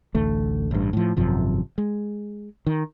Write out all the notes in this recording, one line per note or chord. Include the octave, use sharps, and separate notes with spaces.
A1 D2 A3
A1 G2
A2 F3
G#1 F#2 C3 F3
G#3
D#3